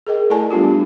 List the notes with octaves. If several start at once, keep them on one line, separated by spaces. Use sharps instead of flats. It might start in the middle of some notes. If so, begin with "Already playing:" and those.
G#4 A#4 D#5 G5
A3 E4 A4 D5 G#5 A5
G3 B3 D4 F4 G4
D4